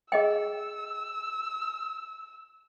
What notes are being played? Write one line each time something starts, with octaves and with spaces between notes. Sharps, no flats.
G#4 D#5 G5 E6